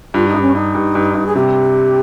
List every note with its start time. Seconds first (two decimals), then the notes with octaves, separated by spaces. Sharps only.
0.14 G2 F4
0.28 D#4
0.34 G2
0.41 C#4
0.54 G2 D#4
0.75 G2
0.95 G2
1.15 G2
1.26 G#4
1.35 C3 G4